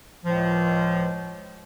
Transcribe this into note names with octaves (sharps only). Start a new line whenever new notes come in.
C#2 A2 F3